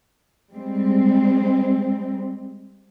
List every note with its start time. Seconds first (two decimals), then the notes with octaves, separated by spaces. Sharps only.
0.51 G3 G#3 C4